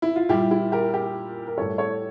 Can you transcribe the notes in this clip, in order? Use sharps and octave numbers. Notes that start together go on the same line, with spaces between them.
E4
F4
A#2 G3 E4 G4
E4 G4
G4 A#4
G4 A#4
A#4
A2 G3 A4 C#5
A4 C#5